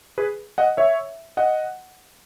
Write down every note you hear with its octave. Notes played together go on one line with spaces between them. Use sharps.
G#4 B4
D#5 F#5
C#5 E5
D#5 F#5